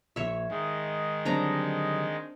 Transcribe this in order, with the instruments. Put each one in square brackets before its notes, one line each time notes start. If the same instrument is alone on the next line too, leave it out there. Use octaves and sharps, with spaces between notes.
[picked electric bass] A#1 [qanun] C#5 E5
[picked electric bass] G#2 [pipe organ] D#3 G#3
[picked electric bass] D3 F#3 G3 [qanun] C4 D4 A#5